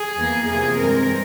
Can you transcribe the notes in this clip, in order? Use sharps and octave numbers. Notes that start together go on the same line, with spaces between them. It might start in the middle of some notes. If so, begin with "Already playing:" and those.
Already playing: G#4
E2 E3 A#3
E2 C3 F3 A#3 G#4
G2 E3 G#3 C4 A#4